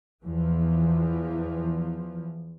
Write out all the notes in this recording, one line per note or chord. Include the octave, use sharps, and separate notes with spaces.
E2 E3 F3